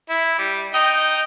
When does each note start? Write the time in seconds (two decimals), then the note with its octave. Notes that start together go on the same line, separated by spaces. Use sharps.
0.09 E4
0.38 G3
0.74 D#4 D#5 G5